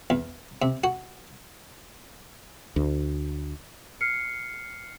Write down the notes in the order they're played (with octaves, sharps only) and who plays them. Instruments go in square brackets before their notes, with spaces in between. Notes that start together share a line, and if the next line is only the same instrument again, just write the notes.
[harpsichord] E2
C3
F#4
[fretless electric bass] D2
[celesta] F6 C7 C#7